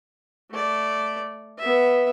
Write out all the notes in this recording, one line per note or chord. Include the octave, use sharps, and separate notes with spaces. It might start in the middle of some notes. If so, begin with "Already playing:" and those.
A3 D5
B3 E5